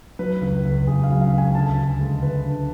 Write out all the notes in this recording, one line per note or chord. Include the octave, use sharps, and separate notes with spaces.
F#3 B4
C#2
C#2
C#2 G#4
F5
F#3
F5
C#2
G#5
D2 A5
D2
G#3
D2 B4
D3